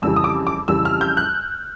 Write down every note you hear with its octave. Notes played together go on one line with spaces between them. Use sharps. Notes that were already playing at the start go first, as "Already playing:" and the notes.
F2 C#3 E3 G3 E6
D#6
D6
D6
F2 C#3 E3 G3 E6
F6
G6
F#6